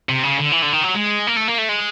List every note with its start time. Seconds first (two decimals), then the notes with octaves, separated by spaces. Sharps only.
0.09 C3
0.23 C#3
0.38 D3
0.52 E3
0.62 D3
0.73 D#3
0.83 F#3
0.95 G#3
1.27 A#3
1.36 A3
1.48 A#3
1.58 A3
1.69 G#3